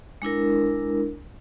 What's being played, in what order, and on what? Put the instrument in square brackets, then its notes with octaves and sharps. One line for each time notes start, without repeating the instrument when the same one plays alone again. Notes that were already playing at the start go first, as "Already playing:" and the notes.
[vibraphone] G#3 D4 E4 A#4